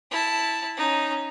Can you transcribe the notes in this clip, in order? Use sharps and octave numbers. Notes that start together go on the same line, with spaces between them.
E4 A5
C#4 D#4